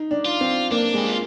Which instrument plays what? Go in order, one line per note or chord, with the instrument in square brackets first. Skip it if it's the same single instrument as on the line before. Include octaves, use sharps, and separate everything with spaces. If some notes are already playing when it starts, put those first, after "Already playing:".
Already playing: [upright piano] D#4
D4
[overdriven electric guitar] F4
[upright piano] C4
[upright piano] A#3 [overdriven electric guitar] D4
[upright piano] G#3 [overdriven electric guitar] G4
[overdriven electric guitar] F4